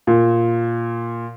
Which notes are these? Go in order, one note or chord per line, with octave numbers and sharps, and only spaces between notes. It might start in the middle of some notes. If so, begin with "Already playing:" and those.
A#2